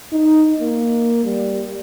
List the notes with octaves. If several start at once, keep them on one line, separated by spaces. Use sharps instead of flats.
D#4
A#3
G3